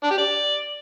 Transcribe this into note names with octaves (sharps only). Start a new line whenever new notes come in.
D4
G4
D5